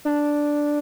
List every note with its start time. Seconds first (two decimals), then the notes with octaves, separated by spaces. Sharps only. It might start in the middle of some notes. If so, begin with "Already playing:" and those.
0.05 D4